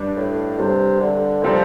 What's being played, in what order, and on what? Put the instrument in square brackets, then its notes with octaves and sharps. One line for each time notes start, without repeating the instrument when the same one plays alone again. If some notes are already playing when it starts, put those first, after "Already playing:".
Already playing: [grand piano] G2 G3 D4
[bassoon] A2
[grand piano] G2 G3 D4 [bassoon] C3
[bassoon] D3
[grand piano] C3 G3 C4 A4 [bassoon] F3